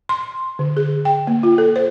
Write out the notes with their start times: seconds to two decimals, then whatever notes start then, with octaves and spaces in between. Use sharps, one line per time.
0.09 C6
0.59 D3
0.77 G#4
1.05 G5
1.27 A#3
1.43 F4
1.58 A4
1.76 C5